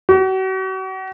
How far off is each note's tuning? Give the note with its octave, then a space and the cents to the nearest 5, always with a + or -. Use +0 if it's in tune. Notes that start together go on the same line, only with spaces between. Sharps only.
F#4 +40